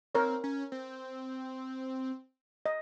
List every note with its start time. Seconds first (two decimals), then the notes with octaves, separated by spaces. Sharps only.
0.15 C4 A#4 C#5
0.44 C#4
0.72 C4
2.66 D#5